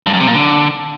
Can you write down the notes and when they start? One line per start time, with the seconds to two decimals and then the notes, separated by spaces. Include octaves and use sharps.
0.06 G2
0.13 F#2
0.20 C3
0.27 A#2
0.34 D3